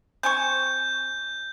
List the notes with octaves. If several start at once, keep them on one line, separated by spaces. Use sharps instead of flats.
C4 G#5 C#6 G6